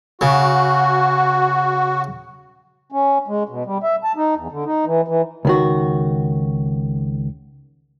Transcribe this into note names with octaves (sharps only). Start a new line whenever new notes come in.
C#3 F#4
C#4
G#3
B2
G3
E5
A5
D#4
E2
D3
D#4
E3
E3
C#2 D#3 F#4